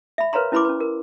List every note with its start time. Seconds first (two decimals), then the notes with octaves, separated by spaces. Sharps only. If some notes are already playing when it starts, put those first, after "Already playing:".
0.18 E5 B5
0.33 A#4 B4 C#5 F5 A#5 C6
0.52 C#4 E4 B4 B5 C6 D6
0.65 C#4 B4
0.80 A#4